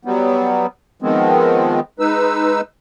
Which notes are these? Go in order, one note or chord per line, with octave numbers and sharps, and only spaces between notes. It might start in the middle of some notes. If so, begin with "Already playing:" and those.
F#3 G3 B3
D#3 F3 G#3 B3 C4
G#3 D#4 B4 E6